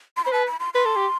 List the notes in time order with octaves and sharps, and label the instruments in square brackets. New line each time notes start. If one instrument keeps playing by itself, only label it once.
[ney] C6
[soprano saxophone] C5 [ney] B5
[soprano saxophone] B4 [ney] A5
[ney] B5
C6
[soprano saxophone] B4 [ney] C6
[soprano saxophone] A4
G4